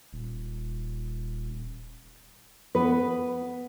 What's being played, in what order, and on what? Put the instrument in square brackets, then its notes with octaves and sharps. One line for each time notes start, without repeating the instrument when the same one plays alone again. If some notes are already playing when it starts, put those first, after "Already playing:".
[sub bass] D#1
[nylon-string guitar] B3 B4